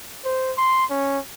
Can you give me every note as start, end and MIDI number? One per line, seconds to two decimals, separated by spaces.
0.25 0.52 72
0.57 0.85 84
0.90 1.19 61